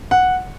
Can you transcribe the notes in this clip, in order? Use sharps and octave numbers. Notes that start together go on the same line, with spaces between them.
F#5